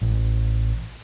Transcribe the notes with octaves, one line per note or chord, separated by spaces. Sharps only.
A1